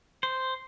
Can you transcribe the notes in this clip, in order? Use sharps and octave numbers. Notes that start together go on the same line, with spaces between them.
C5